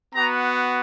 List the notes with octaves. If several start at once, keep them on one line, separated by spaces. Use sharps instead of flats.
B3 F#4 A#5